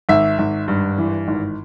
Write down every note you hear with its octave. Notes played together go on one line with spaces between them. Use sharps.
G#1 E5
G#1
G2
E3
G#1